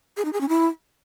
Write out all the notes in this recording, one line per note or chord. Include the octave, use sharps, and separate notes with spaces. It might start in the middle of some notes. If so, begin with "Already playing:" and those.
G#4
D#4
G#4
C#4
E4